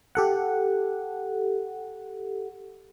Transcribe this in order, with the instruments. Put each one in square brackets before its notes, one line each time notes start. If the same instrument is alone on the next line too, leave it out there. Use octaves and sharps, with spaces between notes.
[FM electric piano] G4 A4 F#5